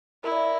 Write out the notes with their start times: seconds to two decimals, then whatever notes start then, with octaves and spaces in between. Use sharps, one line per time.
0.24 E4 A#4
0.32 D5
0.37 E5